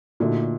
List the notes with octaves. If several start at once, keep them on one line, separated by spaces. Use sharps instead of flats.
A#2 D3 A3 D#4 F#4 A4